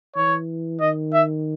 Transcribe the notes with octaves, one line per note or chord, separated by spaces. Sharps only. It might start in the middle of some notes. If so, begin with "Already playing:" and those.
E3 C#5
D#3 D#5
E5